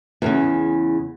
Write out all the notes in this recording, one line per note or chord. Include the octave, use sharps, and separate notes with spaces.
E2 A#2 C#3